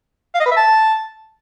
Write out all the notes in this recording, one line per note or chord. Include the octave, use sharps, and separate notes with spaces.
F5
D#5
B4
E5
A5